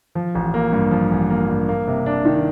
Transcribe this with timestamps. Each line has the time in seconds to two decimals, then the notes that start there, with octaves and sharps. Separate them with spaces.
0.15 F3
0.35 A1
0.54 A#3
0.73 G2
0.91 F3
1.11 A1
1.30 A#3
1.48 G2
1.69 A#3
1.87 C3
2.06 D4
2.25 D#3